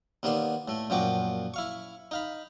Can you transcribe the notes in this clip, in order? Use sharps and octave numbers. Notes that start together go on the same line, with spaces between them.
D#2 A#3 B3 D5 C6
A2 A3
F#2 A#2 F3 F#4 G5 D6
E4 F5 C#6
D#4 F5 B5